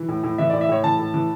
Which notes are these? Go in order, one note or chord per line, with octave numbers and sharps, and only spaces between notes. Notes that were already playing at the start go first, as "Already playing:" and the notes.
Already playing: E3
A2
A2
E3 E5
A2 D5
E5
A2 C#5
E3 A5
A2
E3